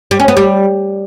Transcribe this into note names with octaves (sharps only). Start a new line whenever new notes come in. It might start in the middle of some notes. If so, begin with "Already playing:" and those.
G3
C#4
B3
G3